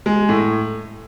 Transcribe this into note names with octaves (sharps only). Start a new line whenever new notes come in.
G#3
A2